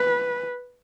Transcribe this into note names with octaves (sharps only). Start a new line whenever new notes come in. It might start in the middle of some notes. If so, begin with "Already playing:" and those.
Already playing: B4